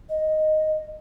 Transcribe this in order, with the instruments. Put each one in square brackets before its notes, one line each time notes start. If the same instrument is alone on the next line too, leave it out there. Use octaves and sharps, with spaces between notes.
[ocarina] D#5